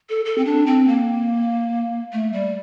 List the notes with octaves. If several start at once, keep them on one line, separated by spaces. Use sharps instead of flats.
A4
A4
C4
D4
C4
A#3
A3
G3